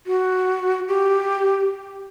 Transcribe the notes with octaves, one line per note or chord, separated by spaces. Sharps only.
F#4
G4